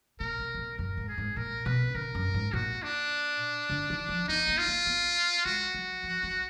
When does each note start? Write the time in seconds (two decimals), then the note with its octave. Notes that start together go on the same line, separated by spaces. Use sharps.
0.20 A#2 A#4
0.39 B2
0.54 B2
0.58 A#2
0.79 F#2 A#4
0.97 G#2
1.08 G#4
1.18 G#2
1.36 A#2 A#4
1.66 B2 B4
1.95 D3 A#4
2.15 F#2
2.34 G#2
2.53 A#2 F#4
2.83 D4
3.70 D3
3.90 D#3
4.09 F3
4.28 B3 D#4
4.48 A#3
4.58 F4
4.68 A#3
4.86 B3
5.45 G#3 F#4
5.74 F#3
6.03 F3
6.23 F#3